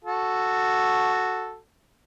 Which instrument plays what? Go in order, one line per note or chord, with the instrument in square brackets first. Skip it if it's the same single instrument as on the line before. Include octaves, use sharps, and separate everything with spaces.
[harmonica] F#4 A4